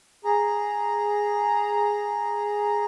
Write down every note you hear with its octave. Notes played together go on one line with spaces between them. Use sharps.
G#4 A#5